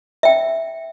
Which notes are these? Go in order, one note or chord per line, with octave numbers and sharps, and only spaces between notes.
E5 G5